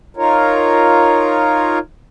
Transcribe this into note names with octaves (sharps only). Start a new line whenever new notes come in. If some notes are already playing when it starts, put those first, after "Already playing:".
D#4 F4 A#4 C#5